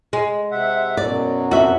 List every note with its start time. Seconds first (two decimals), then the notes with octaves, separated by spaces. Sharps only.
0.13 G#3
0.51 C3 E5 F#5
0.97 F#2 B2 F#3 D5
1.51 F2 F#4 E5